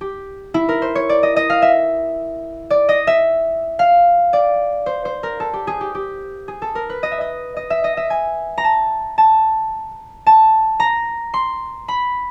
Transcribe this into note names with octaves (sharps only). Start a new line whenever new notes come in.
G4
E4
A#4
C5
C#5
D5
D#5
D#5
F5
E5
D5
D#5
E5
F5
D5
C5
C5
A#4
A4
G4
G#4
G4
G4
G#4
A4
A#4
B4
D#5
E5
D#5
D#5
E5
D#5
E5
G#5
A#5
A5
A5
A5
A#5
C6
B5